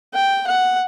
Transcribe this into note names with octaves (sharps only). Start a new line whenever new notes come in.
G5
F#5